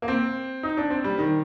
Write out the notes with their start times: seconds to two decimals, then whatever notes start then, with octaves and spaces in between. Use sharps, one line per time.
0.02 A#3
0.08 C4
0.63 D#4
0.77 D4
0.90 C4
1.04 G3
1.18 D#3